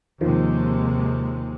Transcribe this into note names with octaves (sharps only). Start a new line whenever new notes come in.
D#2 C3 D#3 F3 G#3